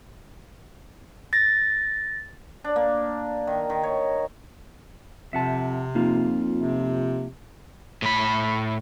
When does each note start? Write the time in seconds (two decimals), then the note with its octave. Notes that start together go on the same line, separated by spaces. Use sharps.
1.33 A6 A#6
2.64 D4
2.76 A#3
3.47 D#3
3.70 D#3
3.83 C#5
5.33 F2 C3 E5 F#5 A5
5.95 F2 A#3 D#4 F4
6.59 C3
8.02 A2 B5